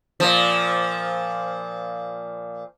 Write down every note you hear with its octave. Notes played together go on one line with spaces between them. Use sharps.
A#2 F3